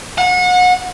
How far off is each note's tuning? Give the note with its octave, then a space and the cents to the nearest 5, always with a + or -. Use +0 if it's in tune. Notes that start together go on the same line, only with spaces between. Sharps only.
F#5 -30